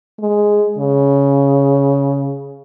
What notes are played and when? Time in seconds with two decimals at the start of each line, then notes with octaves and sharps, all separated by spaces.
0.20 G#3
0.78 C#3